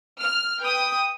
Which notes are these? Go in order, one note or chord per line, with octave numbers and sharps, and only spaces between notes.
F6
B4 G5 D#6